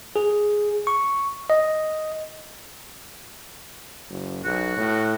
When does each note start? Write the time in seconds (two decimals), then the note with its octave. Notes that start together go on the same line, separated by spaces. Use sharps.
0.16 G#4
0.87 C#6
1.50 D#5
4.09 F#1
4.45 B1 F#4
4.77 A2